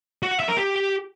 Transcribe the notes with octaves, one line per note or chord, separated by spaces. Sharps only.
F#4
F#5
E5
A#4
G4